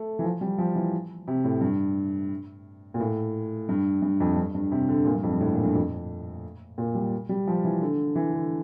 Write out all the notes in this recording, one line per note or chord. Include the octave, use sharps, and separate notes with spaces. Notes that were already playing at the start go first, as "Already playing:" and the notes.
Already playing: A3
E3
F3
G3
F3
E3
C3
A2
G2
A#2
A2
G2
G2
F2
G2
G2
C3
D3
A#2
G2
F2
G2
A2
A#2
G2
F2
A#2
G3
G3
F3
E3
D3
E3
D3